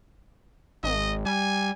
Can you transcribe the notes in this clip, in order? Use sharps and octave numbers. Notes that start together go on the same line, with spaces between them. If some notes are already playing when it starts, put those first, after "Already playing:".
G#1 D#5
G3 G#5